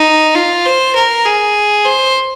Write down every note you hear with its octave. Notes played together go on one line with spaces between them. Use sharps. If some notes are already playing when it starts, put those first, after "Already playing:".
Already playing: D#4
F4
C5
A#4
G#4
C5